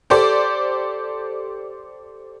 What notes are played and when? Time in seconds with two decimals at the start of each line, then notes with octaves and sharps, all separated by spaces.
0.10 G4 A4 C5 D5